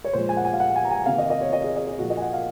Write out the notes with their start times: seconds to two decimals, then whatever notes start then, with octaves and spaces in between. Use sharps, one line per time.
0.04 C#5
0.13 A#2 F3 G#3 C5
0.29 G#5
0.37 F#5
0.45 G#5
0.53 F5
0.60 F#5
0.76 G#5
0.84 A#5
0.91 G#5
1.06 C3 D#3 A#3 F5
1.18 D#5
1.30 D#5
1.41 C#5
1.53 D#5
1.64 G#4
1.76 D#5
1.87 G#4
1.99 A#2 F3 A#3 F#4
2.10 D#5
2.17 G#5
2.22 F#5
2.33 F5